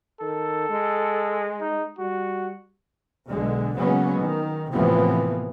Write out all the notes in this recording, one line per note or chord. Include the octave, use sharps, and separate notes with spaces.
D#3 A4
G#3
D#4
G3 F#4
B1 D3 G#3
C#3 F#3 G#3 A#3 B3 C#4
D#3
A2 C3 E3 F3 A#3 B3